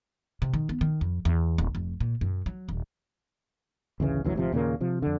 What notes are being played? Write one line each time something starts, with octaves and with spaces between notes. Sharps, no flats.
C3
D#3
B3
D#3
F2
E2
D1
F1
A#2
F#2
F#3
D#1
A1 D2 C#3 E3
A1 D2 E3 F#3
G#1 C3 F3
D#2 A#2 C#3 A#3
C3 F3
F2 D3